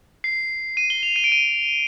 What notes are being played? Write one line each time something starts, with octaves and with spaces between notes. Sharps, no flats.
C7
D#7
G7
F7
D#7
D7
D#7